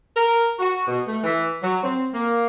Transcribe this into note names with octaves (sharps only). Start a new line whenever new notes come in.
A#4
F#4
B2
A3
E3
F#3
C4
A#3